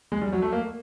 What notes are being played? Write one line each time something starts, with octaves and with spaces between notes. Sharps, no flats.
G#3
G3
F#3
A3
A#3